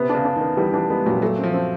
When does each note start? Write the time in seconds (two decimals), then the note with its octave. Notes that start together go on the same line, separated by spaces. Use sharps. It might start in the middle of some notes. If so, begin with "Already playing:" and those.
Already playing: C3 B3
0.09 D4
0.15 C#3
0.25 D4
0.36 D#3
0.41 B3
0.57 E3 G3
0.74 E3 D4
0.90 G#3 B3
1.06 A#2 F#3
1.22 F#3 A3
1.39 F3 C4
1.54 C4